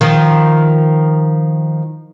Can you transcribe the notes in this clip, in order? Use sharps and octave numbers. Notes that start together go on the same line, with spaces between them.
D#3 F3